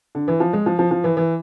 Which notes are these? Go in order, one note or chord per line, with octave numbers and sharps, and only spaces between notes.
D3
E3
F3
G#3
F3
F3
F3
E3
E3